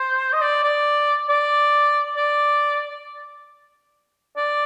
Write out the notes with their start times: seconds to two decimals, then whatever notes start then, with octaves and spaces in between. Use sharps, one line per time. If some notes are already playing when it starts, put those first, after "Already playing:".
Already playing: C5
0.33 D#5
0.41 D5
0.63 D5
1.29 D5
2.16 D5
4.37 D5